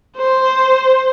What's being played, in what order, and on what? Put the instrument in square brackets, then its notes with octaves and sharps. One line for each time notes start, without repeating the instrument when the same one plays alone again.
[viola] C5